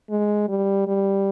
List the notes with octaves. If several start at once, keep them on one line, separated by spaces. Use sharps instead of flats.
G#3
G3
G3